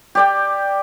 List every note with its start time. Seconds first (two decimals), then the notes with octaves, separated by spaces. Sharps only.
0.15 G4 D5 G5